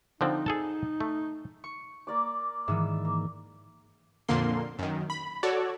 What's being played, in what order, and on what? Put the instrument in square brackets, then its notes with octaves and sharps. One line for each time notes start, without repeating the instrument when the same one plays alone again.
[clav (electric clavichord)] D3 F3 C4 [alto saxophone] D#4
[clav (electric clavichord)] G#4 A4 A5
A3
[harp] C#6
[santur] A#3 D5 D6
[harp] G#2 D#3 E3 [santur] E5
[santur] A#3
[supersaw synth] F2 A#2 D3 A#3 C6
F#2 D#3
B5
F#4 A4 C#5 D5